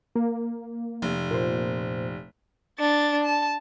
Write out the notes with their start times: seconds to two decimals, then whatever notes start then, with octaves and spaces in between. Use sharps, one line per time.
0.15 A#3
1.02 F1
1.30 A#2 C5
2.79 D4 A6
3.23 A5